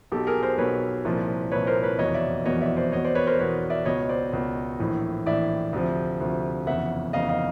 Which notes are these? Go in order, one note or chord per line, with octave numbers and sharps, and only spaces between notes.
B1 B2 G4 A4
G#4 A#4
A#4 C5
B1 B2 B4 C#5
C2 A#2 F3
C2 A#2 F3 B4 C#5
A#4 C5
B4 C#5
F1 E2 B2 C#5 D#5
D5 E5
F1 E2 B2 C#5 D#5
D5 E5
C5 D5
E2 B2 C#5 D#5
C5 D5
B4 C#5
A#4 C5
E2 B2 B4 C#5
D5 E5
C#2 B2 C#5 D#5
C5 D5
C#2 B2
A#1 A2 E3
A#1 A2 E3 D5 E5
D2 C3 F3
D2 C3 F3
F1 E2 C#3 E5 F#5
F1 E2 C#3 D#5 F5
D#5 F5